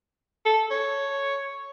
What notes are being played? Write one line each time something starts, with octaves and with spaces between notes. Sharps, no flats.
A4
C#5